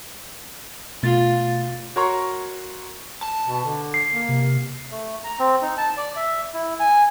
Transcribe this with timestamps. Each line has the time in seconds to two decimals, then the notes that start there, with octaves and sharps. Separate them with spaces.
1.03 B2 A3 F4 A6
1.96 F#4 A#4 C#5 A#5 C6 C#6
3.23 A5
3.47 B2
3.65 D3
3.94 C7
4.12 A#3
4.29 C3
4.91 A3
5.24 A#5
5.39 C4
5.62 D#4
5.78 A5
5.97 D5
6.16 E5
6.54 E4
6.80 G#5